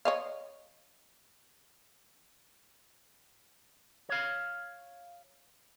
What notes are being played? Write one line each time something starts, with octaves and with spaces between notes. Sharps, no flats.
C#5 D#5 F5
C#5 F5